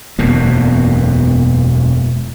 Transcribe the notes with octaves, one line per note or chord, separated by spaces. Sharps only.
E1 F#2 B2 A#3